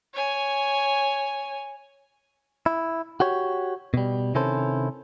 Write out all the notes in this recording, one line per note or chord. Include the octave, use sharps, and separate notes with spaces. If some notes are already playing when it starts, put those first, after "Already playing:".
C#5 G#5
E4
F#4 G4 C#5
B2 G3
C3 D#3 C#4 E4 A4 C5